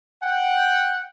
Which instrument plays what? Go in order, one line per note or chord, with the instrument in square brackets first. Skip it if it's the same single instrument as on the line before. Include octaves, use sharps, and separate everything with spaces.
[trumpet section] F#5 G5